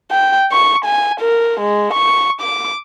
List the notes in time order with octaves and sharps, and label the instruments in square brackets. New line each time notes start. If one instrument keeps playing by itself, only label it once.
[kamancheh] G5
C#6
G#5
A#4
G#3
C#6
D6